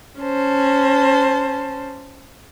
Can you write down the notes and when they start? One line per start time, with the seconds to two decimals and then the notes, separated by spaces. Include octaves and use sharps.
0.20 C#4 C5 A5